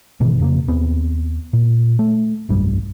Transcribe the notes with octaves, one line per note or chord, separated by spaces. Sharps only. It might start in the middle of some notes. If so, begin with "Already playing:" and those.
G#1 B2 D#3 E3
F2 C#3 A3 A#3
D#2 B3 C4
A#2
A3
F1 B1 G2 G3